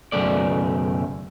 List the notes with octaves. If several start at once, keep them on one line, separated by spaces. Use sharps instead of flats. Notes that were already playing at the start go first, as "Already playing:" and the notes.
B1 F#2 C#3 A3 D5